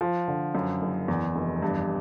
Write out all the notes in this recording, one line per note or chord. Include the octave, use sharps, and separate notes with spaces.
F3
D3
F#2
F#1
E2
F1
G2